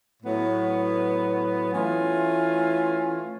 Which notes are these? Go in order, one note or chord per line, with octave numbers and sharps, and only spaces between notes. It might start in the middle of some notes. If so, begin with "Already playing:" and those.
A2 F#3 B3
E3 A3 C#4 F4